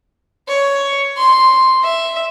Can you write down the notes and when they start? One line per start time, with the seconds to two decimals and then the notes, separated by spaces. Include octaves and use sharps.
0.48 C#5
1.18 C6
1.84 E5